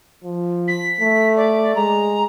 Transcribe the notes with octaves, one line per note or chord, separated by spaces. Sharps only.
F3
B6
A3
D5
G#3 A#5